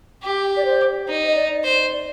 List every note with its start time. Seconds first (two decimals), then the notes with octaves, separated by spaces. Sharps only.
0.23 G4
0.57 D5
0.65 C5
1.08 D#4
1.26 D#5
1.36 D5
1.64 C5 D#5
1.93 D5